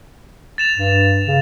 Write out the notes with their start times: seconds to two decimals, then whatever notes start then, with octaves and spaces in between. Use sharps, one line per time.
0.58 A6 E7 F7
0.78 G2
1.27 C#3